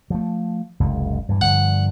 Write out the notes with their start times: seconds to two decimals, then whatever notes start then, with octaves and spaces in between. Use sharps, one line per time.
0.10 F3 A3
0.80 F#1 C#2 C3
1.29 G2 E3
1.41 G2 D3 F3 F#5